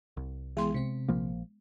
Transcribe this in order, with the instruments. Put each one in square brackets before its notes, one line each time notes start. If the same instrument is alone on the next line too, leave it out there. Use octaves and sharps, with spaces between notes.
[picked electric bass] C2
[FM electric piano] E3 G#4 [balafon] G#3 B3 C6
[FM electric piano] C3 C4
[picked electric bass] A#1 F3 A#3